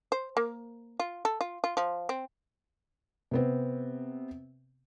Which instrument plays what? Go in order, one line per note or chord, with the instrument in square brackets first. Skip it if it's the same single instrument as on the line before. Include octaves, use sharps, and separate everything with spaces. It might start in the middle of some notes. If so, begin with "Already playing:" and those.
[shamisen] C5
A#3
F4
A4
F4
F4
F3
C4
[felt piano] C3 B3 C4